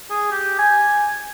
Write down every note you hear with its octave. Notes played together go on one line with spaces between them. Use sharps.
G#4
G4
G#5